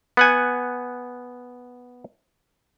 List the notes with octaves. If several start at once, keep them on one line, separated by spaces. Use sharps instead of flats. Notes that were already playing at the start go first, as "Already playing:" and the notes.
B3 F#5 G#5